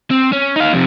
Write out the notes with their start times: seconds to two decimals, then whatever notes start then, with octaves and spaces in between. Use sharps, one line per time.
0.11 C4
0.33 C#4
0.56 D#4 F5
0.73 F2 C3